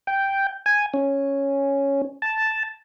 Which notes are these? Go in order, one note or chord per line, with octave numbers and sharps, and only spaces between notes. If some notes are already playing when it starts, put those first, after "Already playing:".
G5
G#5
C#4
A5